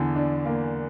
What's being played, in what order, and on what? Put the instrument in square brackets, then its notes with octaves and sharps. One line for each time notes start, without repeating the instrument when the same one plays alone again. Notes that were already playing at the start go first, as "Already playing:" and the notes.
Already playing: [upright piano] E2 E3 [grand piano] D3
[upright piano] D4
A#3